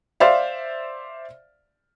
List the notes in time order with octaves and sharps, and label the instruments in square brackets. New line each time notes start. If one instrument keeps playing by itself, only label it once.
[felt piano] C5 D5 E5 F5